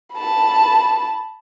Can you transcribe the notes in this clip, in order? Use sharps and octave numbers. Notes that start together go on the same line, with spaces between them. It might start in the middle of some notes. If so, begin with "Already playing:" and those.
A5 B5